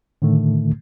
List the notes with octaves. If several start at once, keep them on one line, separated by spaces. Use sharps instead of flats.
A2 D3 D#3 A3